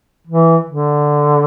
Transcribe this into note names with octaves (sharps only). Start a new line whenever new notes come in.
E3
D3